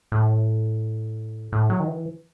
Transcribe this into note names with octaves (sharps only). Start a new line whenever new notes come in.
A2
A2
F#3
D#3
E3